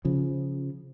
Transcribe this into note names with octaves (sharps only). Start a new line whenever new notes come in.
C#3 F3